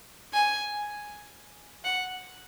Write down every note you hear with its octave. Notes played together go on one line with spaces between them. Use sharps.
G#5
F#5